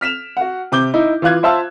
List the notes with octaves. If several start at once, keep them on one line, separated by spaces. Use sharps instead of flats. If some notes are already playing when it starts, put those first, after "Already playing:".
F6 B6 E7 F7
F#4 F#5
C3 D6 G6 G7
D#4 E4
E3 F4 F5 F#6 G#6
F4 C5 E5 F5 A5 E6